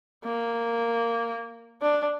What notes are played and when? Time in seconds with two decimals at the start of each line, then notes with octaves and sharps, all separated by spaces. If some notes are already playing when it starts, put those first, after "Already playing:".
0.25 A#3
1.82 D4